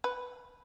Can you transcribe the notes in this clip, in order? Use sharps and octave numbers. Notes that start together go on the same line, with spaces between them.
B4